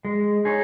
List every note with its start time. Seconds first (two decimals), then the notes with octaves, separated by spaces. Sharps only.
0.05 G#3
0.45 D#4 G#4 C#5